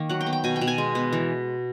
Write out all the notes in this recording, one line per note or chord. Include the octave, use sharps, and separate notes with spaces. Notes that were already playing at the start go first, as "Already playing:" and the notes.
Already playing: D#3 A#3
F#3 F#5
G5
B3
G5
B2 G#5
G5
B2
G#5
G#3
B3
E3